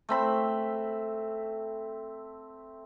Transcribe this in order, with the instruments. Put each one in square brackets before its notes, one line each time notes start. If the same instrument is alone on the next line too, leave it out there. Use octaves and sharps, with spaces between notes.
[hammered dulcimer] A3 C4 B5